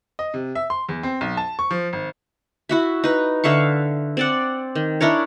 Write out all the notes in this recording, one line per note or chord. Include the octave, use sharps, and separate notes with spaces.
D#5
C3
E5
C6
E2
C4
B1
A5
C#6
F3
G#1
E4 F#4 E5
D#4 B4
D3 E5 F5 C#6
C4 D5 F#5
D#3
D4 E4 A#4 C#5